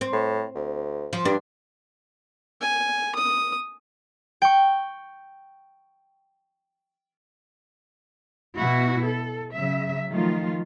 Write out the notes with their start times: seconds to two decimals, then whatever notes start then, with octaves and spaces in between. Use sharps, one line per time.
0.01 C4
0.13 A2
0.55 D2
1.13 F3
1.25 G2 D4
2.62 G#5
3.16 D#6
4.42 G5 C#6
8.57 B2 B3 E4 F#4
9.04 A4
9.52 C#3 F#3 E5
10.10 D#3 F3 F#3 A3 F4